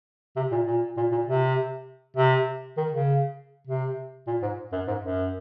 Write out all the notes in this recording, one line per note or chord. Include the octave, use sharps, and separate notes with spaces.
C3
A#2
A#2
A#2
A#2
C3
C3
D#3
C#3
C3
A#2
G#2
F#2
G#2
F#2